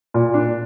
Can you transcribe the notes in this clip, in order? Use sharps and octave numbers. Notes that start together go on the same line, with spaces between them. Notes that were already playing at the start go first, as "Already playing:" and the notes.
A#2
D4